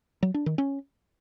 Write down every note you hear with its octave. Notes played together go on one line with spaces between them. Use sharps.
F#3
D4
D#3
C#4